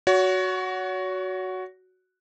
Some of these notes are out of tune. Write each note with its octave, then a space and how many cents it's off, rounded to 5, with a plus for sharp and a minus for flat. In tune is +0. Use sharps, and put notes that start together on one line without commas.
F#4 +0 C#5 +35